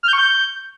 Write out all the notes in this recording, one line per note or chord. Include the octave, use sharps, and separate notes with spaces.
F6
G6
C#6
G6